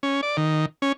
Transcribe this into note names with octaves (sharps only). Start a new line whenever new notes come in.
C#4
D5
D#3
C#4